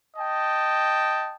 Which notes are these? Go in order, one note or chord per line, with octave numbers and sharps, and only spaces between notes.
D#5 G5 A5